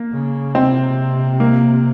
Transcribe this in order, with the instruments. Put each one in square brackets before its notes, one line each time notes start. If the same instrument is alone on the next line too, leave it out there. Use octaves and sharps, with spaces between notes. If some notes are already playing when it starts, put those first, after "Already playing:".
Already playing: [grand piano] A#3
[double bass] C#3
[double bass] C3 [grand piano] C4
[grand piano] A#3